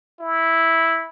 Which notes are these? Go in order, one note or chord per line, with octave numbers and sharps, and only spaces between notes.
E4